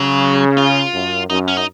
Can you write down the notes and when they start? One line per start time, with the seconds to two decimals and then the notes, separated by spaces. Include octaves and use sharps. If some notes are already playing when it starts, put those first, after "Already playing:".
Already playing: C#3 F#3
0.58 F4
0.94 F#2
1.30 F#2 D#4
1.48 C#4
1.57 D#4